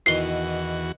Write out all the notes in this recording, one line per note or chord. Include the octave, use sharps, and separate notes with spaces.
E2 B2 D#3 E3 F#4 C7 G7